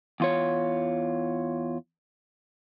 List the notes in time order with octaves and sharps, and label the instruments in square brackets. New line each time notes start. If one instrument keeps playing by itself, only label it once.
[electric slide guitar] E2 F4 C#5